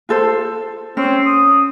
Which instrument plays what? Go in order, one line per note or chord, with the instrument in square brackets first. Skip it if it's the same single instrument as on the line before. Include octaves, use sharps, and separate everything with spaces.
[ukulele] F4 A4 C5
[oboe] C4 [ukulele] C#4
[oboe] D#6